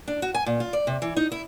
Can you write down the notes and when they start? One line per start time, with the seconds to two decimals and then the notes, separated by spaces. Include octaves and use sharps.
0.08 D4
0.22 F#4
0.34 G#5
0.46 A#2
0.60 F4
0.73 D5
0.87 C3
1.02 E3
1.17 D#4
1.32 E4